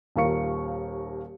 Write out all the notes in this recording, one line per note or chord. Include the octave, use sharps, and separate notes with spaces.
D#1 D#2 A#4 F5 C#6 C#7